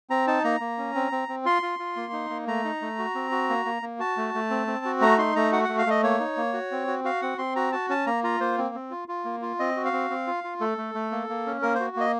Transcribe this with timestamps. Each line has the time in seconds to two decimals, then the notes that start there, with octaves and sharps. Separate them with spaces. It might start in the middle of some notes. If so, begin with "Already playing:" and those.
0.10 C4 A#5
0.27 D#4 A5
0.44 A#3 A#5
0.60 A#3
0.78 C#4
0.95 C4
1.12 C4
1.29 C4
1.45 F4 C6
1.62 F4
1.79 F4
1.96 A#3
2.13 D#4
2.30 A#3
2.47 A3 A#5
2.64 D#4
2.82 A3
2.99 F#4
3.15 C4
3.31 F#4
3.49 A#3
3.65 A#3
3.82 A#3
3.99 F#4 A5
4.17 A3
4.34 A3
4.50 C4
4.67 C4
4.85 F#4
5.01 A3 A#5
5.18 D#4 C6
5.36 A3 A#5
5.52 F#4 F#5
5.64 A3 F#5
5.78 F5
5.86 A3 D#5
6.03 A#3 C#5
6.20 D#4
6.37 A#3
6.53 F#4
6.71 C4
6.87 F#4
7.04 F#4 F5
7.22 C4 F#5
7.38 C4 C6
7.56 F#4 A#5
7.72 F#4 A5
7.89 C#4 A5
8.06 A#3 A#5
8.24 F4 A#5
8.40 A#3 C5
8.58 C4
8.75 C4
8.91 F4
9.08 F4
9.25 A#3
9.42 F4
9.59 C4 D#5
9.77 F#4
9.85 F5
9.93 C4
10.10 C4
10.27 F4
10.44 F4
10.60 A3 A4
10.78 A3
10.95 A3
11.11 A#3
11.29 A#3
11.46 C#4
11.62 A#3 A#4
11.75 C5
11.80 F#4
11.96 A#3 D#5